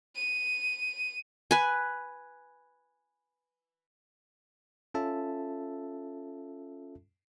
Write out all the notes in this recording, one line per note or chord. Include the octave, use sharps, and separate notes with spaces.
D#7
B4 G#5
C#4 F4 A4 E5 A5